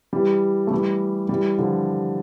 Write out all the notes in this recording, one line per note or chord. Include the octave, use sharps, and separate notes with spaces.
E3 G3
A3
E3 G3
E3 G3
D3 F3